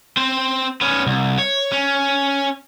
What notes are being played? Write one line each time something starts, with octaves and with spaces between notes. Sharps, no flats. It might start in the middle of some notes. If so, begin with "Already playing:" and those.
C4 C5
B3 C#4
C2
C#5
C#4